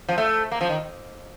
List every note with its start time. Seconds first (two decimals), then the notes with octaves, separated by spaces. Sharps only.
0.09 F3
0.18 A3
0.52 A#3
0.61 F3
0.69 D#3